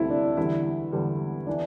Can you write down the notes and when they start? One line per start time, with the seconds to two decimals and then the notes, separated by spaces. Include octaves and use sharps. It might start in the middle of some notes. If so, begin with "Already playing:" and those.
Already playing: D2 C3 G3 C4 E4 A4
0.10 D4
0.37 E2 D3 G3 E4
0.92 E2 D3 G3
1.47 E3 D4